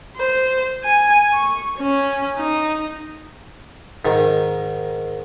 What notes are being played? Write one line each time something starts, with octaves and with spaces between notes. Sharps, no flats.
C5
G#5
C#6
C#4
D#4
G#2 D#3